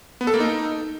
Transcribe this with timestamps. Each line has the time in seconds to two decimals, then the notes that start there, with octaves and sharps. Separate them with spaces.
0.21 B3
0.27 A4
0.34 A#3
0.40 D#4